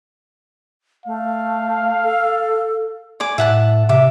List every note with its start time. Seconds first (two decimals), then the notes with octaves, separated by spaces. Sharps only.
1.06 A3 F5
2.03 A4
3.20 D5 G#5 D6
3.38 A2 E5 F#5 A5
3.89 C3 E5 D6